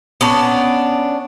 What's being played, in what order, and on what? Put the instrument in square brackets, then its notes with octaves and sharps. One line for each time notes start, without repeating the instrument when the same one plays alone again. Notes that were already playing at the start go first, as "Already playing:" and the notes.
[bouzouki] B3 C#4 D4